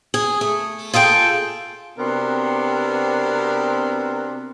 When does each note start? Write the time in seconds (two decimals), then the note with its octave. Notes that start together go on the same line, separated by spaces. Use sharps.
0.14 G#4
0.41 A3
0.94 F4 G#4 A4 G5
1.99 C3 B3 C4 D4 F#4 A#4